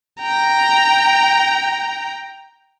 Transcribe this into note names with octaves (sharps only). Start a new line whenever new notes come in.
G5 A#5